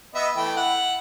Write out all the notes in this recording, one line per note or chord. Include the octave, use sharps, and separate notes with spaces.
B3 D#5 E5
E3 A3 G5
E4 F#5